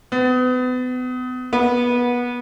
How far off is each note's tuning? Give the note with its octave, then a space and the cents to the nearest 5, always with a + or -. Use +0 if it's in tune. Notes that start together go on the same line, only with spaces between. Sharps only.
B3 +35
B3 -20